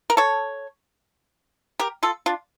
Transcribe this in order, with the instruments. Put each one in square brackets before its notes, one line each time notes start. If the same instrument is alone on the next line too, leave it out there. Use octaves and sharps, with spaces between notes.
[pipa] A#4
A4 C#5
G4 A#4
F4 A4
D4 F4